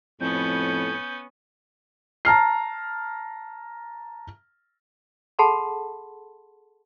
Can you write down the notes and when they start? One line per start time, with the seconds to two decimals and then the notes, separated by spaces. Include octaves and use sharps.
0.21 F2 A2 B3 C#4 G6
2.25 A5 A#5 F6 C7
5.39 G#4 A4 F#5 A5 B5 C6